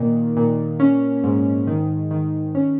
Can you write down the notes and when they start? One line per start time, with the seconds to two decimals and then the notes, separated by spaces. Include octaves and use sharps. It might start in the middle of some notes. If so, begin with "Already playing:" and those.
Already playing: A#2 D#3
0.37 A#2
0.80 C#4
1.24 G#2
1.67 D#3
2.11 D#3
2.55 C#4